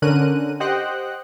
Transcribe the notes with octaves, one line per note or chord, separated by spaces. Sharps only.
D3 C#4 A#4 F#6 D#7
G4 C5 D#5 F#5 G5 F#6